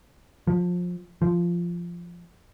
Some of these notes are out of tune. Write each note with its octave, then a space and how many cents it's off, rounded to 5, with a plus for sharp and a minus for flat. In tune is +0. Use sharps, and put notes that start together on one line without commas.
F3 +25
F3 -10